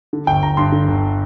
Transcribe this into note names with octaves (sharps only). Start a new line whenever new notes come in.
D3
G1 G5
G1 A#5
G2 C6
D3
G1